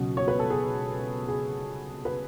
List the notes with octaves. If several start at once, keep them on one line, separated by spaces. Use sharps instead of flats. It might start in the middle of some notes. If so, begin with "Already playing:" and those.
Already playing: C#2 B2 F#3 C#4
C#5
B4
A4
G#4
G#4
B4